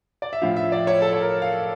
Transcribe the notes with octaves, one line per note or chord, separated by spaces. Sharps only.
D5
E5
A2 F3 F5
E5
D5
C#5
A4
C#5
A#4
F5